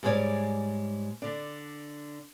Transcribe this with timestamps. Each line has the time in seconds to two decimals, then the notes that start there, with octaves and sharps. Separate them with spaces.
0.03 G#2 G3 G#3 B3 C#5 D5
1.22 D3 D4